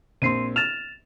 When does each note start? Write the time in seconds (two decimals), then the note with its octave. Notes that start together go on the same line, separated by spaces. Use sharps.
0.22 A#1 C4 C6 C7 D#7
0.56 F6 A6 E7 F7